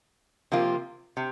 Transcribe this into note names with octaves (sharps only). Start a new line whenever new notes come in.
C3 F3 A#3 F4
C3